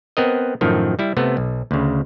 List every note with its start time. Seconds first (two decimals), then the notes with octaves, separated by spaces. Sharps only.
0.17 B3 C4 A#4 D#5
0.61 F#2 A2 D#3 F3
0.99 G3 E4
1.17 C3 A3 B3
1.37 B1
1.71 D2 C#3